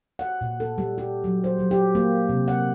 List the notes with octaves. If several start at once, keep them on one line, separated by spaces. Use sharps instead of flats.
F#5
A#2
A4
G3
G4
F#3
C5
F#3
G4
A#3
C3
F#5